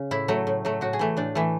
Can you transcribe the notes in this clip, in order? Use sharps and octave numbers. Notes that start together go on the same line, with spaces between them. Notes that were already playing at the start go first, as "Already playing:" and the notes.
Already playing: C#3
A2 E4
F#3 A3
A2
F#3 A3
A2 F#4
G#4
E3 A3
A2 D4
E3 A3